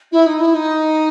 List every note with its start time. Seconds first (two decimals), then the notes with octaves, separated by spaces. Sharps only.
0.11 E4
0.26 D#4
0.39 E4
0.54 D#4